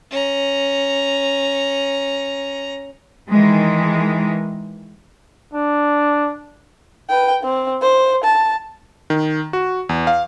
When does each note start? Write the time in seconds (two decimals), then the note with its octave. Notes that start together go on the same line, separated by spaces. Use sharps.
0.10 C#4 A#5
3.30 D#3 E3 G#3
5.54 D4
7.09 B4 G5
7.43 C4
7.82 C5
8.24 A5
9.10 D#3
9.53 F#4
9.89 E2
10.07 F5